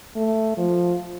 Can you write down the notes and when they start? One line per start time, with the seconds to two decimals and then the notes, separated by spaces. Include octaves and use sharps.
0.16 A3
0.58 F3